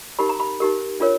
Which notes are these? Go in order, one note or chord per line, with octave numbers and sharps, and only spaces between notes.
D#4 G4 A#4 B5
A#5
B5
D#4 G4 A#4
D4 F4 A#4 C#5